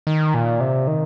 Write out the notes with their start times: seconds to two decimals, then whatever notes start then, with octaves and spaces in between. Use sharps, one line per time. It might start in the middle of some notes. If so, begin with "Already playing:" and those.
0.07 D#3
0.34 A#2
0.60 C3
0.87 D#3